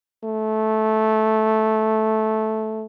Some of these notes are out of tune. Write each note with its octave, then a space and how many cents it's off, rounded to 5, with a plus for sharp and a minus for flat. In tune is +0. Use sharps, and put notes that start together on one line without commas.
A3 -10